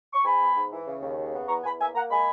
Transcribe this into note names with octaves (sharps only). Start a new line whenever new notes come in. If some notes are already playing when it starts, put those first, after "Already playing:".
C#6
G#2 G#5 B5
B3
G#2
E3
C#3
D#2
C#3
B3
E2 A#5 C#6
E2 G#5 B5
A#3 E5 G#5
A#3 F#5 A#5
G#3 G#5 B5